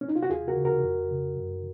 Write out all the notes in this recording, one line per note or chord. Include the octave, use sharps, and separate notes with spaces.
C#4
D#4
F4
F#4
D#2 F4 G#4
F#4 A#4
C#3
F#4 A#4
F2
C#3
F#2